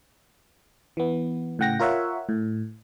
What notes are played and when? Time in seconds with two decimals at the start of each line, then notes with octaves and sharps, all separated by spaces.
0.97 E3 B3
1.59 A2 C#3 F#5 G5 A#6
1.79 F4 A#4 C#5 E5 F#5
2.29 A2